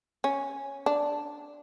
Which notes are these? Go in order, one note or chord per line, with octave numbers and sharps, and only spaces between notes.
C#4
D4